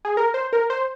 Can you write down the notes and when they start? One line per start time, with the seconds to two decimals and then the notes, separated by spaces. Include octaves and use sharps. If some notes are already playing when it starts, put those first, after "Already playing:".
0.05 G#4
0.17 A#4
0.34 C5
0.53 A#4
0.70 C5